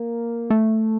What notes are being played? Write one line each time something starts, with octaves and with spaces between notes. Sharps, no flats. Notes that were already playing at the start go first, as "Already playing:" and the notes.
Already playing: A#3
A3